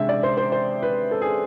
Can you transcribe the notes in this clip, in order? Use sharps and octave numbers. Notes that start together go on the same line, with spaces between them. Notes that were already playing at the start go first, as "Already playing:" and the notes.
Already playing: C3 G#3 D4 E5
D5
C5
C5
C5
B4
A4
G#4